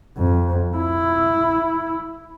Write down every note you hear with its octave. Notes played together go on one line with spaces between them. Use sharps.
F2
E4